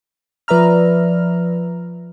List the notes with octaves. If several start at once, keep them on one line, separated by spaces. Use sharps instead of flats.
F3 B4 D5 E5 A#5 F6